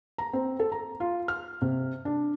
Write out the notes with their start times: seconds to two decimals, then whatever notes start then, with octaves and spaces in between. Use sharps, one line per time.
0.18 A#5
0.33 C4
0.60 A4
0.72 A#5
1.00 F4
1.28 F6
1.62 C3
2.05 D4